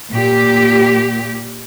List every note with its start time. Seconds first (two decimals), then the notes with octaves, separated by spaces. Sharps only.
0.13 A#2 G4